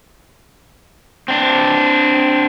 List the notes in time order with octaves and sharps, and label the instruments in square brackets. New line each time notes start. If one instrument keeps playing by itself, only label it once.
[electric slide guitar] C4 D4